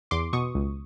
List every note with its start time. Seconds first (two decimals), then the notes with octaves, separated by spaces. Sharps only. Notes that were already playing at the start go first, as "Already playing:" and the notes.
0.11 E2 C6 D6
0.33 B2 C#6 D#6
0.55 C#2